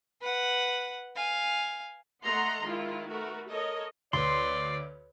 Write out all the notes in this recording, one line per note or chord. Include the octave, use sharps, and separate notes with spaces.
B4 F#5
F5 G#5
A3 D#5 F#5 A#5 C6
D#3 G#3 E4 F4
A3 F#4 A#4 B4
A4 A#4 C#5 D#5
D2 B4 C#5 D5 C6